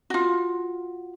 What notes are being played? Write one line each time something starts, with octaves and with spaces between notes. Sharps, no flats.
F4 F#4